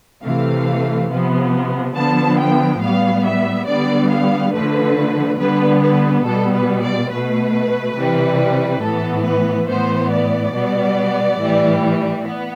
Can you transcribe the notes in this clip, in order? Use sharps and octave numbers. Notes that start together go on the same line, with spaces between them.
C3 E3 A3 F5
C3 F3 B3
D3 F3 B3 A5
G5
A2 G3 B3 F5
E5
D3 G3 B3 D5
F5
D3 F3 A3 B4
D3 G3 B3 B4
B4
B2 G3 B3 A4
B4
D5
B2 A3 B4
C3 E3 G3
A2 E3 B3 A4
B4
A2 E3 B3 C5
D5
B2 G3 B3
A2 E3 G3
B3